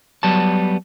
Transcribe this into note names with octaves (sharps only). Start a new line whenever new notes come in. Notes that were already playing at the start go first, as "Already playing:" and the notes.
F#3 G3 B3 A5